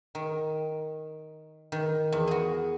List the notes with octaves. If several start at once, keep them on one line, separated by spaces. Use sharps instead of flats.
D#3
D#3
E2
F#4 G#4